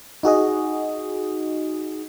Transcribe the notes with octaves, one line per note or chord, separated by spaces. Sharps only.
D#4 F#4 G#4 D#5